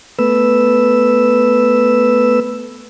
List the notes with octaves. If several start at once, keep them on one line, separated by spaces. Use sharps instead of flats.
A3 B3 B4 E6